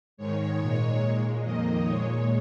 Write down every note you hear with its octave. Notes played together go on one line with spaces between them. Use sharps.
G#2 D#3 G#3 C#5
A#2 G#3
A#2 G#3
F2 D#3 A#3 D#5
A#2 G#3 C#5